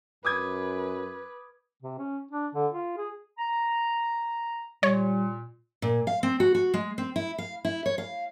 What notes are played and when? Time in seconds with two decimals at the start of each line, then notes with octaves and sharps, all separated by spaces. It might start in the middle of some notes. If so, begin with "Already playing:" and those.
0.25 F#2 B4 D6 D#6 G#6
1.83 C3
1.98 C#4
2.31 D4
2.55 D3
2.72 F4
2.97 G#4
3.38 A#5
4.83 A#2 G3 C#5
5.82 A#2
6.07 F5
6.23 C4
6.40 F#4
6.55 F#4
6.74 G#3
6.98 C4
7.16 E4
7.38 F5
7.65 E4
7.86 C#5
7.98 F5